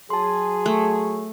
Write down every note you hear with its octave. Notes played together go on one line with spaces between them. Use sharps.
F#3 G#4 A5 C6
A3